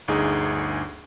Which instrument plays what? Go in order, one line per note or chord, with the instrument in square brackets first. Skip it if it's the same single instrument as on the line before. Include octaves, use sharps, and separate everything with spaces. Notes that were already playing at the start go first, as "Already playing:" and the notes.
[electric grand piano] G1 D2 D#4 G#4